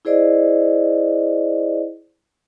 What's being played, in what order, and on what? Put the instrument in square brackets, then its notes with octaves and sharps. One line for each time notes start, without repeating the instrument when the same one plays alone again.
[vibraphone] E4 G#4 C5 D5 D#5